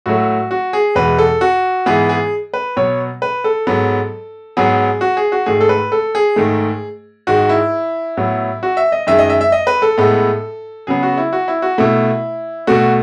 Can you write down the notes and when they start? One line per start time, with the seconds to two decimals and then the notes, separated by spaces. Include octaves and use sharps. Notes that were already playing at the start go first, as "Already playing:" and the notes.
0.06 A2 F#3 A3 F#4
0.51 F#4
0.73 G#4
0.95 E2 B2 G#3 B4
1.18 A4
1.41 F#4
1.86 G#2 E3 G#3 B3 G#4
2.09 G#4
2.54 B4
2.76 B2 F#3 B3 C#5
3.22 B4
3.44 A4
3.67 G#2 F#3 B3
4.57 G#2 F#3 B3 G#4
5.01 F#4
5.17 G#4
5.32 F#4
5.46 G#2 D#3 A3 G#4
5.61 A4
5.69 B4
5.92 A4
6.15 G#4
6.36 G#2 D#3 A3
7.27 G#2 D#3 G#3 F#4
7.49 E4
8.17 A2 F#3 B3
8.63 F#4
8.77 E5
8.92 D#5
9.07 F#2 D#3 G#3 E5
9.19 D#5
9.30 E5
9.41 E5
9.52 D#5
9.67 B4
9.82 A4
9.98 A2 G#3 B3
10.87 C#3 F#3 B3 G#4
11.03 F#4
11.18 E4
11.33 F#4
11.48 E4
11.62 F#4
11.78 B2 A3 E4
12.67 B2 A3 F#4